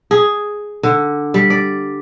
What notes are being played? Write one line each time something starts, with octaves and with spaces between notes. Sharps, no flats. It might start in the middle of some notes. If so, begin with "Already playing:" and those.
G#4
D3
G3
D5